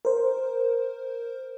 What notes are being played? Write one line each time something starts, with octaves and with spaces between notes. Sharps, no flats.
A#4 C5